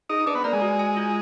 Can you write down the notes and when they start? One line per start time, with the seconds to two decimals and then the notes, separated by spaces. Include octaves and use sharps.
0.09 D#4 G#4
0.26 D4 B4
0.35 B3
0.44 A#3 D5
0.53 G#3
0.62 F#4
0.79 G#5
0.97 F4